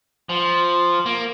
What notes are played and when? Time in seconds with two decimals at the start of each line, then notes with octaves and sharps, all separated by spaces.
0.29 F3
1.06 A#3